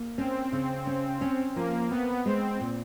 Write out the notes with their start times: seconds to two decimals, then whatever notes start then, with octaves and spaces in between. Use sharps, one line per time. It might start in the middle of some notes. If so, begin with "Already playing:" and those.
Already playing: A#3
0.17 C4 C#4
0.53 C#3
0.87 C#4
1.21 C#4
1.56 F3 A#3
1.90 B3 C4
2.25 G#3 C4
2.60 A#2